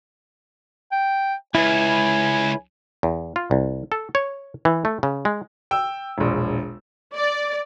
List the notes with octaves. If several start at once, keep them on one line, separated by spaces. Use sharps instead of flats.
G5
C#2 E4 B4 G#5
E2
F4
C2
A4
C#5
E3
A3
C#3
G#3
G5 E6
E1 A#1
D5